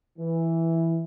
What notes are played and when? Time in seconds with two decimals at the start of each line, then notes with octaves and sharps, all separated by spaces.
0.19 E3